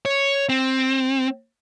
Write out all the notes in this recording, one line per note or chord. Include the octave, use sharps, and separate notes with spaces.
C#5
C4